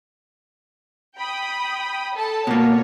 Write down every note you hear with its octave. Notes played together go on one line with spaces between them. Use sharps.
G5 B5 D#6
A4 A5
B2 A#3 C#5